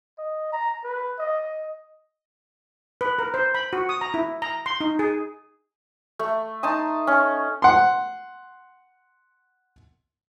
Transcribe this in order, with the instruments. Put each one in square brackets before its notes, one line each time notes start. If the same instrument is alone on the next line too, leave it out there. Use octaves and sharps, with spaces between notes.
[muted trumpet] D#5
A#5
B4
D#5
[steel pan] B4
A#4
C5
B5
F#4
D#6
A#5
E4
A#5
C6
D#4
G#4
[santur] A3
D#4 A5 C6 D#6
C#4
[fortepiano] F#5 C6